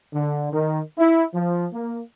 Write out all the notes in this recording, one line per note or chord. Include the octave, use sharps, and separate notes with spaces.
D3
D#3
E4
F3
A#3